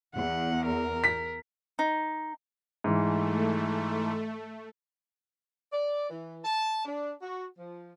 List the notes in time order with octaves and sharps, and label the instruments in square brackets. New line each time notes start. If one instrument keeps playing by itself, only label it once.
[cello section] E2 [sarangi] F#5
[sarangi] A#4
[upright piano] B6
[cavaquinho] D#4
[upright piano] G#2 E3 [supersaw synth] A3
[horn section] D5
E3
A5
D4
F#4
F3